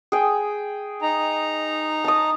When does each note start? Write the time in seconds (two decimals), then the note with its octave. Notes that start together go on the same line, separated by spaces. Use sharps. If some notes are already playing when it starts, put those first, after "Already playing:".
0.12 G#4 G5
1.02 D#4 A#5
2.04 A5 D#6